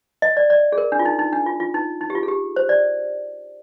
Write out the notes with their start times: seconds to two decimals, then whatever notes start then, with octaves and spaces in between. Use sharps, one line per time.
0.22 D#5
0.37 D5
0.50 D5
0.72 G#4
0.78 A#4
0.92 D4
0.99 F4
1.05 D#4
1.19 D#4
1.33 D4
1.46 F4
1.60 F4
1.74 D#4
2.01 D#4
2.10 G4
2.15 F4
2.23 G#4
2.28 G4
2.56 C5
2.69 D5